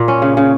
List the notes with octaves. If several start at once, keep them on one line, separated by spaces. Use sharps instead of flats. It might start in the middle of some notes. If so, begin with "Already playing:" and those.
Already playing: A#2
C#4
C#3
C#3